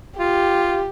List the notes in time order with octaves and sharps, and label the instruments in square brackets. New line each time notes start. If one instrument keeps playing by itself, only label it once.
[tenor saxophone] F4 [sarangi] G4